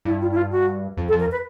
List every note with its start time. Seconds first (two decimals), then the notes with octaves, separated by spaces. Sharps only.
0.05 G2 E4
0.21 F4
0.32 E4
0.36 F4
0.51 F#4
0.97 F2
1.08 A4
1.12 F2
1.20 A#4
1.32 B4